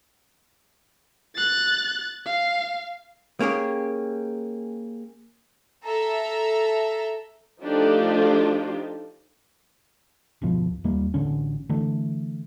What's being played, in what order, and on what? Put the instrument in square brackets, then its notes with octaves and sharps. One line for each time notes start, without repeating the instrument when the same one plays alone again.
[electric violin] F#6 A6
F5
[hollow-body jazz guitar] A#3 C#4 G4 G#4
[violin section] A4 E5 A#5
[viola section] F3 A3 D4 D#4 F4 G4
[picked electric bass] D1 G1 B2 F3
D#2 G3 A#3
A1 D3 C#4
D3 E3 A3